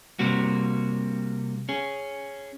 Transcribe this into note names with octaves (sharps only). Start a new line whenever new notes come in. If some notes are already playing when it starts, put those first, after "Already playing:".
C3 G3 A#3 F#4
C#4 G#4